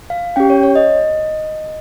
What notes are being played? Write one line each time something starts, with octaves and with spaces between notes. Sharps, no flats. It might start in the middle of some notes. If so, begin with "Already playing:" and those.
F5
C#4 G4 G5
C#5
C#5
D#5